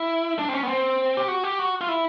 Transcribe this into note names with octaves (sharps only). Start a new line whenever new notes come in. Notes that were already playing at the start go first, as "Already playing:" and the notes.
Already playing: E4
D4
C4
C#4
B3
C4
G4
F#4
G4
F#4
F4
E4